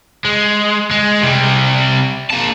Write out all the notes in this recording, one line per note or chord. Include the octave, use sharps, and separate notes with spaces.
G#3
G#3
C3 G3
A#3 A5